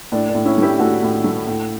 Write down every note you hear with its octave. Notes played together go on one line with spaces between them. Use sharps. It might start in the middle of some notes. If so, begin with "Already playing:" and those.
A2 D4
D4
A2
C#4 E4
A3 E4 G4
A2 F#4 A4
A2
A3
A2